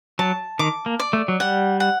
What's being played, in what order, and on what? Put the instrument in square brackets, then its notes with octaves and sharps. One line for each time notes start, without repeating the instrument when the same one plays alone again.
[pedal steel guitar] F#3 [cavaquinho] A5
[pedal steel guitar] D#3 [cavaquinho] D6
[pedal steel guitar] A#3
[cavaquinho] D5
[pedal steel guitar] A3
F#3
[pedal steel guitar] G3 [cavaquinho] F#5
[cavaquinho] F#5